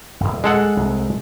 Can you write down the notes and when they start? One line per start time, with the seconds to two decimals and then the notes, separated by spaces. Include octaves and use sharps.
0.20 D#1 G#1
0.44 G#3 A4 F#5
0.77 C2